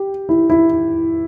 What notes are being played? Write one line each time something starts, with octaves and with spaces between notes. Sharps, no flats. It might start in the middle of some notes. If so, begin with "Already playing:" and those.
Already playing: G4
E4
E4